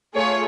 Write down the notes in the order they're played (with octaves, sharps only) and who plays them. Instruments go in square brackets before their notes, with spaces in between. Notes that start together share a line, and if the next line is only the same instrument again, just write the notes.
[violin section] A3 F4 G#4 C#5